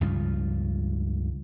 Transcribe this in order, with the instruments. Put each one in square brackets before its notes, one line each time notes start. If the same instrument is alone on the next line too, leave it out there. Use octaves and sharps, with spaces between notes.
[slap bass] C#2 G2 C#3 F3